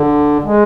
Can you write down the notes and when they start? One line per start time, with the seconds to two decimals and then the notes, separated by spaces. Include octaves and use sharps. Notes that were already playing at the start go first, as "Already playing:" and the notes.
Already playing: D3
0.44 G#3